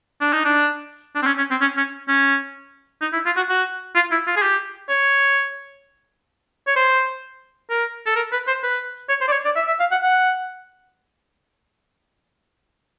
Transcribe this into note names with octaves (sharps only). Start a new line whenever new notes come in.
D4
D#4
D4
D4
C4
C#4
C#4
C4
C#4
C#4
C#4
D#4
E4
F4
F#4
F#4
F4
E4
F4
G#4
G4
C#5
C#5
C5
A#4
A4
A#4
B4
C5
B4
C#5
C5
D5
C#5
D5
E5
E5
F5
F#5
F#5